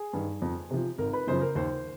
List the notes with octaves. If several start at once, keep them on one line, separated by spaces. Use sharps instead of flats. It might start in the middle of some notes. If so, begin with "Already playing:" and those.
Already playing: G#4
G2 D#3
F2
C3 F3
G#1 A#4
B4
F#2 C#3 F3 C5
A#4
D#2 C5